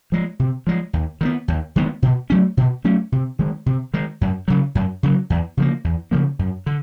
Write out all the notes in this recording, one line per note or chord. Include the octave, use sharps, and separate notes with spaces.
F3 G#3
C3
F3 G#3
D#2
D#3 G#3 B3
D#2
D#3 G#3 B3
B2
F#3 A3 C#4
B2
F#3 A3 C#4
C3
D#3 G#3
C3
D#3 G#3
F#2
C#3 F#3
F#2
C#3 F#3
E2
C#3 F3 A#3
E2
C#3 F3 A#3
F#2
D3